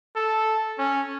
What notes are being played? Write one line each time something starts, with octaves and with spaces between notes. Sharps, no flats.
A4
C#4